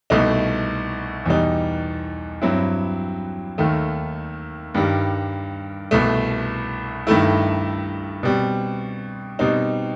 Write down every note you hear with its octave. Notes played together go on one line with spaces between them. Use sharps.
C2 B2 A3 D#4
E2 B2 G3 D#4
G2 F#3 C4 E4
D#2 D#3 A3
G2 D#3 G3
C2 B2 A3
G2 D#3 A3 E4
B2 G3 C4
B2 G3 C4 D#4